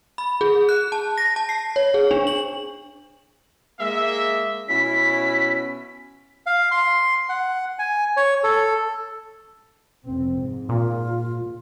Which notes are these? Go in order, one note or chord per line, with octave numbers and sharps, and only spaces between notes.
B5
G#4
F#6
A5
A#6
A5
C7
C#5
G#4
D4
F#7
G#3 A#3 E5
B2 C#4 E4 B6
F5
C6
F#5
G#5
C#5
A4
F1 C4
G#2
A#2 F4